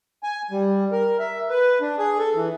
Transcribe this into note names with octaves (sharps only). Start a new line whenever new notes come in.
G#5
G3
A#4
E5
B4
D4
G#4
A4
E3